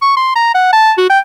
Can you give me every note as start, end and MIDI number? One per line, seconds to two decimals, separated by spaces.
0.02 0.15 85
0.17 0.33 84
0.36 0.50 82
0.55 0.68 78
0.73 0.92 81
0.97 1.09 66
1.10 1.19 79